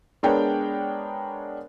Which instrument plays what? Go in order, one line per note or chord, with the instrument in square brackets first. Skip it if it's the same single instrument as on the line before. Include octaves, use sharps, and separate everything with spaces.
[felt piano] G#3 B3 D4 A#4 C#5 G5